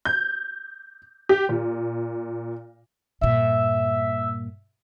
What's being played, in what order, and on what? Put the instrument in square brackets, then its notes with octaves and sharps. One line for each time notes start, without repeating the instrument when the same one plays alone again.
[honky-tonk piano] G6
G4
A#2
[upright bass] G2 A#2 [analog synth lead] E5